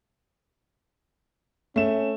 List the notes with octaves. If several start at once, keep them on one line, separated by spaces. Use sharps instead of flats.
A3 C#4 E7